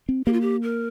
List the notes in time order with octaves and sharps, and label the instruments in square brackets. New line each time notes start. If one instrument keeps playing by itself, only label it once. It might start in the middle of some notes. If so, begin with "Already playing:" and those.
[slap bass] C4
[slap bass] A#3 [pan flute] G4
[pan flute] F4
G4
A#4